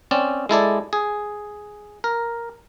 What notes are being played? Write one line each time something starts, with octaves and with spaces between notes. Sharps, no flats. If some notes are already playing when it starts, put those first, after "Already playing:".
C4 C#4 D5
G#3 E4 A4 D5
G#4
A#4